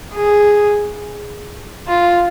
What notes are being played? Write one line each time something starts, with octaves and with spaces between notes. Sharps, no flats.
G#4
F4